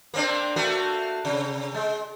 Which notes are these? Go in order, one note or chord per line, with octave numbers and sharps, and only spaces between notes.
A#3 C4 D4
A3 A#3 F#4
C3
G#3